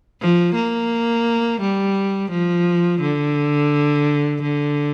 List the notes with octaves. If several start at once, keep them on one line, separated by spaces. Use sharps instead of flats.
F3
A#3
G3
F3
D3
D3